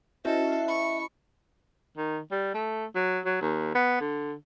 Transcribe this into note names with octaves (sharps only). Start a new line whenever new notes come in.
C#4 E4 F#4 A4 C5 D#5 E5
B5 C#6
D#3
G3
A3
F#3
F#3
D#2
B3
D3